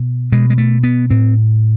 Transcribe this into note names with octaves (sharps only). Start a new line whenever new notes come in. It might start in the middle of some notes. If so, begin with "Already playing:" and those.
Already playing: B2
B2 G#3
G#3
A3
B3
A2 C4